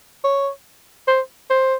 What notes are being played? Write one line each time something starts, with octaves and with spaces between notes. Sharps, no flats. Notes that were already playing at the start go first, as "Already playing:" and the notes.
C#5
C5
C5